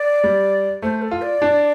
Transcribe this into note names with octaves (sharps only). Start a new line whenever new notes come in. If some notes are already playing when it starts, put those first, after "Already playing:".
Already playing: D5
G3
A3 C5
A4
F4
D5
D4